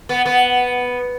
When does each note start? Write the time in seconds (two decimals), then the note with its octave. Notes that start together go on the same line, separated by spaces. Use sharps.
0.09 B3
0.26 B3